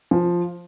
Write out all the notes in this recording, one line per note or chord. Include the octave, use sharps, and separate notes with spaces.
F3